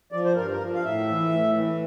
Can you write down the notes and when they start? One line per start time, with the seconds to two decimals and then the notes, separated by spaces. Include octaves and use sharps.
0.12 F3 D5
0.25 C5
0.36 G2 A#4
0.52 A#4
0.61 F3
0.74 F5
0.84 A2 E5
1.08 E3
1.32 A2
1.56 E3